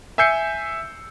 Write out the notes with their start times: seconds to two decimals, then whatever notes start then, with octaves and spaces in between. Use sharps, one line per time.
0.18 E5 G#5 E6 G6 C7 C#7